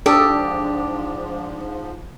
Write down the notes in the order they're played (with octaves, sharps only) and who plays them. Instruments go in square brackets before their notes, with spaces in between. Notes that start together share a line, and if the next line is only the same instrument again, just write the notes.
[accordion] G#2 F3 [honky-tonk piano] D4 [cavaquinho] G4 D#6 [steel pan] A4